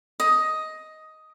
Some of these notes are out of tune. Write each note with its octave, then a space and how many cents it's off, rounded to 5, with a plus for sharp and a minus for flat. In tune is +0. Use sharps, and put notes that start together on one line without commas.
D#5 +10